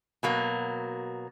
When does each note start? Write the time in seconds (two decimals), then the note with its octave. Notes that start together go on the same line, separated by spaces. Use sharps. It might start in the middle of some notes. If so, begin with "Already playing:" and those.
0.23 B2 F#3 A#3